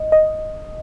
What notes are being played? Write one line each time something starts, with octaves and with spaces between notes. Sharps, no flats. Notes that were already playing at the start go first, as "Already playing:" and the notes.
Already playing: D#5
D#5